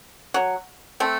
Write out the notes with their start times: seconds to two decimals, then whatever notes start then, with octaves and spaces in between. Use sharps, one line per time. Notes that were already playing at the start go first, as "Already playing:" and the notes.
0.34 F#3
1.00 A3 C4